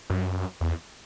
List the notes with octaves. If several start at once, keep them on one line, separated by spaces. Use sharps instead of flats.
F#2
E2